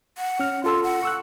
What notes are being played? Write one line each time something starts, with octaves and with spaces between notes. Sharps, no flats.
F#5
C#4 F6
F4 A4 C6 E6
F#5
C#6 E6 F#6